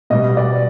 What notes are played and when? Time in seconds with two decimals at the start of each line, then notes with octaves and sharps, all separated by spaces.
0.10 B2 G3 D#5
0.37 D5